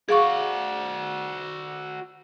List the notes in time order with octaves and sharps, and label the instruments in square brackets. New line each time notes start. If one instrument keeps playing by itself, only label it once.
[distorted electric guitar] F#4 D5 [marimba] G#4 F5 C#6